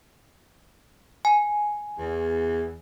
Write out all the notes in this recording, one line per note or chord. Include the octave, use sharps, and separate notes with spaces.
G#5
E2